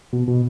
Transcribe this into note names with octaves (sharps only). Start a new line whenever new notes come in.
B2
B2